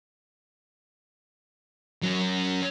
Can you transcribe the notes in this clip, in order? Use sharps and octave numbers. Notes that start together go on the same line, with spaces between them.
F#3 C#4